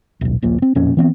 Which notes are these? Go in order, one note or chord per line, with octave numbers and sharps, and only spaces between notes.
D#1 B1
D#1 A#1 A#2
C4
E1 F2 A#2 C#4
E3 B3 C4